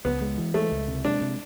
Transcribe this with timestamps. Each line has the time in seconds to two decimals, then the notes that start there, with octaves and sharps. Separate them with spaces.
0.05 C#2 B3
0.21 G#3
0.38 E3
0.54 G#3 A3
0.71 C#2
0.88 C3
1.04 G#3 D4
1.21 C3